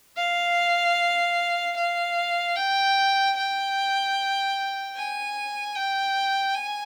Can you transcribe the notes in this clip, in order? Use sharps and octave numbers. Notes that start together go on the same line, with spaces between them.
F5
F5
G5
G5
G#5
G5
G#5